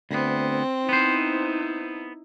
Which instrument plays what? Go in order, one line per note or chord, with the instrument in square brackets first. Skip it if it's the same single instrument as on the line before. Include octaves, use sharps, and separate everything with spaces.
[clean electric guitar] D2 B3 [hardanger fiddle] C4
[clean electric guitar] B3 C5 [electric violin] D#4 E4